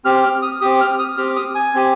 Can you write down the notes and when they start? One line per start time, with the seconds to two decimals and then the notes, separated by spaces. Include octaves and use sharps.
0.05 C4 G4 F6
0.23 F6
0.42 D#6
0.61 C4 G4 D#6
0.81 F6
0.99 D#6
1.17 C4 G4 F6
1.36 D#6
1.55 G#5
1.74 C4 G4